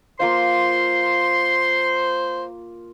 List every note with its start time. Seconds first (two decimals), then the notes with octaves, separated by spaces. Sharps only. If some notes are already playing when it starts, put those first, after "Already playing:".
0.20 A#3 F4 C5 F5 C6